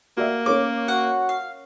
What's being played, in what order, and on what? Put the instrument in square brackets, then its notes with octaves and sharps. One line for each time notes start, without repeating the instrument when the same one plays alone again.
[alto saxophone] A#3 [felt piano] F#4 D5 E5
[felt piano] C#4 A#4 C#5 [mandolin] D6
[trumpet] F#4 [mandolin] F#5
[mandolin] F5